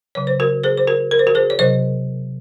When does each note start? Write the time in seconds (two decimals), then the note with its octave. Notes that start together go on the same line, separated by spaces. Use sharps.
0.15 C#3 F#3 C#5
0.27 C5
0.40 F#4 A#4
0.64 G#4 C5
0.77 C5
0.87 F#4 A#4
1.11 A#4
1.19 C5
1.27 F#4 A#4
1.35 G#4 C5
1.50 C#5
1.59 C3 F#3 C5 D#5